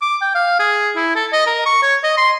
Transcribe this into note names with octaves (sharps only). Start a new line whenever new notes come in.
D6
G5
F5
G#4
E4
A4
D#5
A#4
C#6
C#5
D#5
C6